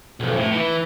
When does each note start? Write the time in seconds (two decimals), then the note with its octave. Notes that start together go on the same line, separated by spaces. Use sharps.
0.20 B1 F2
0.36 A2
0.52 E3 E4